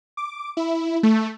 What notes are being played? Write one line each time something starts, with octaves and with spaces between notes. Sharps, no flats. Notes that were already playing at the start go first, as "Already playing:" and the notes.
D6
E4
A3